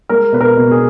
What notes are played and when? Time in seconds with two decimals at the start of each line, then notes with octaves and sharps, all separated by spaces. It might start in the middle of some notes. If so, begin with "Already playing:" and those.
0.09 G#3 A#4
0.32 B2 B4
0.41 A#4
0.57 B2
0.71 G#4